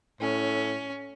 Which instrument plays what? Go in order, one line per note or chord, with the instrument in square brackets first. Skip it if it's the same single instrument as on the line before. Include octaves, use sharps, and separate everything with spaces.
[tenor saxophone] A2 [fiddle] C#4